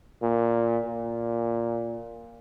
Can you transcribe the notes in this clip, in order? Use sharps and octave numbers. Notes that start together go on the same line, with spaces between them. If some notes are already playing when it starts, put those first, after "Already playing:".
A#2
A#2